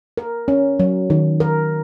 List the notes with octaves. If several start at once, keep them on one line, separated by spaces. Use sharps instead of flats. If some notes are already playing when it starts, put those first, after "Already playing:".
A#4
C#4
F#3
D#3
A#4